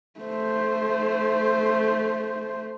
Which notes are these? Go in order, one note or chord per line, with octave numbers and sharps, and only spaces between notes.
A3 C5